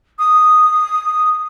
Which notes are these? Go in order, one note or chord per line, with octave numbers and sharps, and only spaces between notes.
D#6